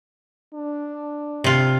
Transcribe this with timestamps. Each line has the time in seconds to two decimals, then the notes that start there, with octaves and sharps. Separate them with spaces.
0.54 D4
1.44 C3 F4